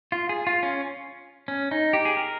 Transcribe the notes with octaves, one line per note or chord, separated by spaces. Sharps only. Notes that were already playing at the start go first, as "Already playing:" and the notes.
F4
G#4
F4
C#4
C#4
D#4
G4
G#4
A#4